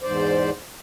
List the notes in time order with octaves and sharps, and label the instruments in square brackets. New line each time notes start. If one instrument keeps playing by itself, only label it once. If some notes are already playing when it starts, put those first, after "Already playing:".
[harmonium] E2 G#2 C5 D5